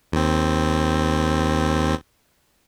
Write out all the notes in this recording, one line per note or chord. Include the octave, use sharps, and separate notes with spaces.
D#2 C4